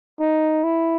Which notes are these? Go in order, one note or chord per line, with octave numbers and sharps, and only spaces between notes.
D#4
E4